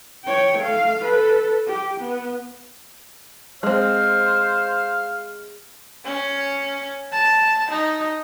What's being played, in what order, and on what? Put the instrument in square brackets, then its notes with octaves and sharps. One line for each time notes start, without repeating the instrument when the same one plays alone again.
[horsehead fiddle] C#5 G5
A3 F5
A4 B4
G4
B3
[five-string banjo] G#3 C4 [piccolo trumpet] C5 [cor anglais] F5
[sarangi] C#4
A5
D#4